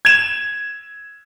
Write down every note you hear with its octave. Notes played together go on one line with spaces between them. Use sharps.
G#6 E7